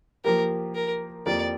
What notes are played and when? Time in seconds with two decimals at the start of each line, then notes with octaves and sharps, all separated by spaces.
0.25 F3 A#3 G4 A#4
0.75 A#4
1.26 F2 F3 A#3 G4 D5